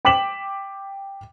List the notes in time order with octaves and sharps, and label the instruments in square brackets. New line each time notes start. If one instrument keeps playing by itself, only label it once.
[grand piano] G5 D6 B6 E7 F#7